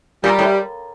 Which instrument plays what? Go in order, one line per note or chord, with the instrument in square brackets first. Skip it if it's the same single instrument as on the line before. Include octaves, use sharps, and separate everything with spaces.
[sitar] A#2 [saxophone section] G3
[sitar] A2